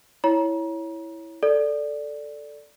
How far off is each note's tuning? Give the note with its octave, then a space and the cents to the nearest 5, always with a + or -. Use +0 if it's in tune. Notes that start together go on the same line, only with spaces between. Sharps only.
E4 +0 C#5 +0 A#5 +30
A4 +0 D5 +0